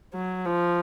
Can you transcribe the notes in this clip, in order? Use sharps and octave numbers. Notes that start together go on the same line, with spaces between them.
F#3
F3